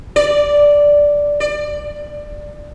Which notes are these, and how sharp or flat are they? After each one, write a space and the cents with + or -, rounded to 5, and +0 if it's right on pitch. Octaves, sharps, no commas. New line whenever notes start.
D5 -5
D5 +15